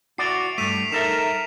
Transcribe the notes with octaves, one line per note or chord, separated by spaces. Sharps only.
E4 F#4 D5 C7 D7 F7
G2 A3 B6 D#7 F7
D#4 A4 A#4 E5 E7